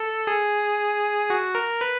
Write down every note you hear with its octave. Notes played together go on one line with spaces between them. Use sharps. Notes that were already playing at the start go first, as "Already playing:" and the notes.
Already playing: A4
G#4
F#4
A#4
B4